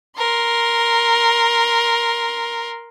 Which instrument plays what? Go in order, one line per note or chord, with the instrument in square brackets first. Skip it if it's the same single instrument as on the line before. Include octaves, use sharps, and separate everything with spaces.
[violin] A#4 C6